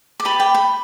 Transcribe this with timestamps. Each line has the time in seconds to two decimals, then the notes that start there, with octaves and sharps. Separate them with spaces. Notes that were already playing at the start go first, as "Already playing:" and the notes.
0.20 D6
0.25 G4 B4 D5 B5
0.40 G5
0.55 B5